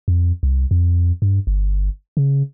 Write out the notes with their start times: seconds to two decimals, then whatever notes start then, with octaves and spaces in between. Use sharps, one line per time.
0.08 F2
0.43 C2
0.71 F2
1.22 G2
1.47 G1
2.17 C#3